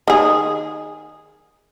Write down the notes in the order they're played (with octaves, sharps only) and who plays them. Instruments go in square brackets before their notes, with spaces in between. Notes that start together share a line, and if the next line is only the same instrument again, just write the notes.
[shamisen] D#3 G#4